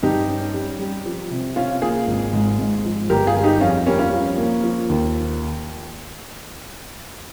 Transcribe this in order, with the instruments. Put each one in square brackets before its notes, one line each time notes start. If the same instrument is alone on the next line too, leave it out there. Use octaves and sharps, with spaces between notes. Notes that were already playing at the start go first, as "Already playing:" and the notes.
[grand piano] G2 [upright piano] D#4 G4
[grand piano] C#4
G3
G3
F3
C3
[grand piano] C3 [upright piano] C#4 F4
[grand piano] A#3 [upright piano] F4 G#4
[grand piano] G#1
G#2
G#2
F3
[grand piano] G1 [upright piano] G4 A#4
[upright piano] F4 G#4
[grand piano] G3
[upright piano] D#4 G4
[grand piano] F2 [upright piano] C#4 F4
[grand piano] G3 [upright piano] A#3 C#4
[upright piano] C#4 F4
[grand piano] F3
A#3
F3
D#2